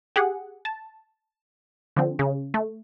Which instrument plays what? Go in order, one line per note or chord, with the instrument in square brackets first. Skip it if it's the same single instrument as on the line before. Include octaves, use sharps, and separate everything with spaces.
[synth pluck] G4 G#4 F#5
A5
D3 F3 C4
C#3
A3